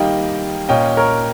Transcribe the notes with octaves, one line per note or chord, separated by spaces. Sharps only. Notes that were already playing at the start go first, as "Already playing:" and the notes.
Already playing: D#3 G3 A#3 D#5 G5
A#2 A#3 C#4 D#5 G5
A#4 C#5